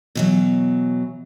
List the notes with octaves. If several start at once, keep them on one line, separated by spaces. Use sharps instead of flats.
B2 E3 F#3